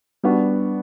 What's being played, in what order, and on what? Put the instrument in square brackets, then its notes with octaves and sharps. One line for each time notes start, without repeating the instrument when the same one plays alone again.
[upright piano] G3 B3 D4 F#4